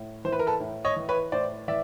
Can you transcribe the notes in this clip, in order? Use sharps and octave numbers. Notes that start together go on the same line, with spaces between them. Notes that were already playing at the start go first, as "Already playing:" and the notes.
Already playing: A2
E3 C5
B4
A#4
A4 B4
A2
C#5 D#5
E3
B4 C#5
A2 C5 D5
E3 D5 E5